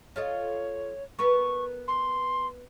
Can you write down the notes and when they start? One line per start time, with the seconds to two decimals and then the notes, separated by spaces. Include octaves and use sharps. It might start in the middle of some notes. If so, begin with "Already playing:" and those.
0.16 F4 A4 C#5 D#5
1.19 B3 A#4 B4 C#6
1.88 C6